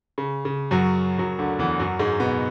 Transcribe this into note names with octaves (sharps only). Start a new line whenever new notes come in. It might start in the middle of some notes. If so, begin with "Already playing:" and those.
C#3
C#3
F#2 F#3
F#2 F#3
D2 D3
E2 E3
F#2 F#3
G#2 G#3
B2 B3